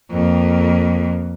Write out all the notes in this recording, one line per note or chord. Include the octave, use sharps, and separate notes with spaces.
F2 A#3